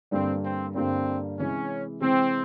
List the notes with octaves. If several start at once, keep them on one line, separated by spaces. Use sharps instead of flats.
G2 D3 G3 A#3 C4 D4
C4
G2 D3 G3 A#3 C4 D4
C3 E3 G#3 C#4
C3 E3 G#3 C4